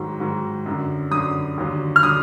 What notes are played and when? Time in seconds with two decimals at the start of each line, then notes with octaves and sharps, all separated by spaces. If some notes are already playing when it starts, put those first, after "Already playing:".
Already playing: G#2 D#3 F#3
0.20 G#2 D#3 F#3
0.66 F#2 D3 F#3
1.11 F#2 D3 F#3 D#6
1.57 D#2 D3 F#3
1.96 F6
2.03 D3 F#3 D#6